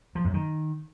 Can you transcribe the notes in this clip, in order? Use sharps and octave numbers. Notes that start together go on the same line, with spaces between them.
F3
F#2
D#3